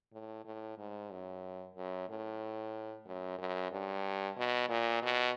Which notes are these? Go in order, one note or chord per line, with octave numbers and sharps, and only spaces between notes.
A2
A2
G#2
F#2
F#2
A2
F#2
F#2
G2
B2
A#2
B2